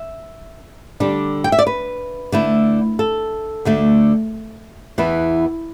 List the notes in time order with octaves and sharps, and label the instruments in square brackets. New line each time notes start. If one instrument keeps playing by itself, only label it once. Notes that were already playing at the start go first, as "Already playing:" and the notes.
Already playing: [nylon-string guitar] E5
D3 G3 D4
G5
E5
D5
B4
D3 A3 E4
A4
D2 D3 A3
E2 E3 B3 E4